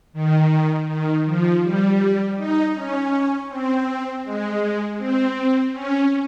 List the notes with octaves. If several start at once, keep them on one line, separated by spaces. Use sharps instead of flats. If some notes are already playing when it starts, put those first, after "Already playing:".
D#3
D#3
F3
G3
D#4
C#4
C4
G#3
C4
C#4